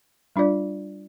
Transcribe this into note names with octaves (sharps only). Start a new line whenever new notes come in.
G3 D4 F4 D5